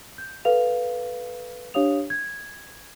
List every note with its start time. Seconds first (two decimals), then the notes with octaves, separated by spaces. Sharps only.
0.18 G6
0.45 A4 B4 F5 F7
1.74 D4 G4 C#5 F5 D#6 F7
2.10 G#6